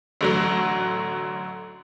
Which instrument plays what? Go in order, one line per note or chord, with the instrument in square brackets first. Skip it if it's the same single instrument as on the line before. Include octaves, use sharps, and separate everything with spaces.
[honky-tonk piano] A1 D3 F#3